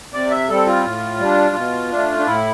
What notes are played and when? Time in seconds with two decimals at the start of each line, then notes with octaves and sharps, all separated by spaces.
0.13 C3 D5
0.31 E5
0.49 G3 C4 A4
0.67 F4
0.85 A2
1.20 G3 D4
1.56 B2
1.91 A3 D4
2.19 D4
2.27 A2 E4